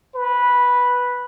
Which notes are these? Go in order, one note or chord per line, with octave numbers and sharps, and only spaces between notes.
B4